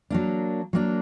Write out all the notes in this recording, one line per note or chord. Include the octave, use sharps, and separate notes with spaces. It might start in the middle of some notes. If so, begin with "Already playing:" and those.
F#3 A#3 D4
F#3 A#3 D4